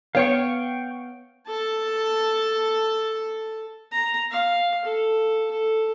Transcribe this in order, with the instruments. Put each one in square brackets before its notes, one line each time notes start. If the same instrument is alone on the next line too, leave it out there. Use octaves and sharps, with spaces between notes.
[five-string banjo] B3 C#5 [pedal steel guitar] F5 G5 C#6
[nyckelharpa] A4 A5
A#5
F5
A4
A4